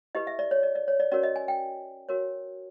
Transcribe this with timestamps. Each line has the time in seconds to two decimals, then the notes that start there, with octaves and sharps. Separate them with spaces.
0.15 E4 G4 B4 D#5
0.27 E5
0.39 D5
0.51 C#5
0.63 D5
0.75 D5
0.88 C#5
1.00 D5
1.12 C#4 F#4 A#4 C#5 D5
1.23 D#5
1.36 G#5
1.48 G5
2.09 F#4 A#4 C#5